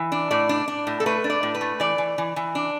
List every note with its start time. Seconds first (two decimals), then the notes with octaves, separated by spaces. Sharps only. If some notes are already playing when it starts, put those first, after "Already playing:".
Already playing: E3
0.12 D4
0.31 A2 D5
0.49 D4
0.68 D4
0.87 A2
1.00 A4
1.06 A3 B4
1.24 D4
1.30 D5
1.43 A2
1.55 B4
1.61 A3
1.80 E3 D5
1.98 E3
2.18 E3
2.36 E3
2.55 D4